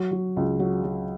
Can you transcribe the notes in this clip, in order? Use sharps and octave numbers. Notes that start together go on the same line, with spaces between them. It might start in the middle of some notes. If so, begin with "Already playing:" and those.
Already playing: F#3
F#3
C#2
F#3
F#3